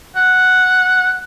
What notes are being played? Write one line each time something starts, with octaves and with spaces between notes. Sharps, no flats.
F#5